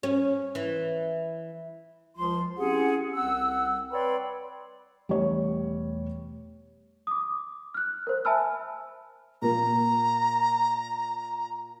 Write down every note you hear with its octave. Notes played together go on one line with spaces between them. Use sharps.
C#4
E3
C#2 F3 F4 C6
C4 C#4 E4 G4 G#4 F#5
C2 C4 F#5 E6
B4 C#5 D5 G5 B5 C6
E1 E2 G3 A3 C#5
D6 D#6
F6 F#6
A#4 C5
E5 G#5 A5 B5 E6 F6
A#2 A#3 A#5